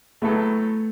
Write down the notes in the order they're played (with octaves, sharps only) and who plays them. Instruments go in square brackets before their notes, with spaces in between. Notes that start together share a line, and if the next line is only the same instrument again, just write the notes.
[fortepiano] A2 F#3 B3 A4 [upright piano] A3